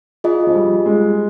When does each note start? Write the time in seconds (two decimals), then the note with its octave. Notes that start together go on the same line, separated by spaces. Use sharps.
0.24 F4 G#4 D#5
0.47 F3
0.55 G3
0.86 G#3